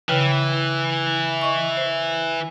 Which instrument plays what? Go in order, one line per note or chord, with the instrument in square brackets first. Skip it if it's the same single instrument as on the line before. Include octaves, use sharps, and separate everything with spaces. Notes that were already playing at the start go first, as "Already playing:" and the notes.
[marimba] C#3 B4 G5 [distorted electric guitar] E3
[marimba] D#5 C#6
C5